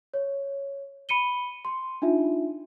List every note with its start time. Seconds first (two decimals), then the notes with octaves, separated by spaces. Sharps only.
0.14 C#5
1.09 B5 C#7 D#7 G7
1.65 C6
2.02 D4 D#4 F4 E5